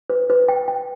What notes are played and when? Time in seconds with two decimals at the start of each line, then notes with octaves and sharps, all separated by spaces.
0.10 B4
0.30 B4
0.48 G5
0.68 G5